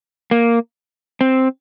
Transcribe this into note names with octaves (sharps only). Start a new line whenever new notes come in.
A#3
C4